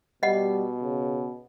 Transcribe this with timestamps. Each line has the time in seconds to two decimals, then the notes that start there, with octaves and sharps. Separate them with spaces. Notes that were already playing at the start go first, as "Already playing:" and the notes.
0.23 B2 G3 D#5 F#5
0.81 C#3